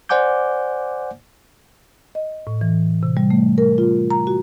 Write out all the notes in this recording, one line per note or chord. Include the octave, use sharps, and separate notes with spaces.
C5 D5 F#5 G#5 D6 G6
D#5
A2
E3
C3
G3
A3
A#4
F4
A#5
F#4